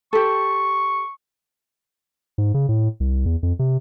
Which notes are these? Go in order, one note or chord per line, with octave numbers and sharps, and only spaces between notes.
G4 A4 C#6
G#2
C#3
A2
C2
E2
F2
C3